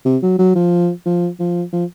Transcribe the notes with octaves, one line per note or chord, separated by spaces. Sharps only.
C3
F#3
F#3
F3
F3
F3
F3